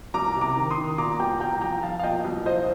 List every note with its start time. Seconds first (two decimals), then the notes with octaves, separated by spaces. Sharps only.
0.14 C2 A#5 D6
0.36 C3
0.41 A#5 D6
0.57 D#3
0.70 C6 D#6
0.78 D#3
0.98 A#2 A#5 D6
1.19 C2 G5 A#5
1.40 C2 G5 A#5
1.61 F3 G5 A#5
1.83 F3 F5 A5
2.00 F5
2.03 A#2 D#5 G5
2.25 C2
2.46 F3 C5 D#5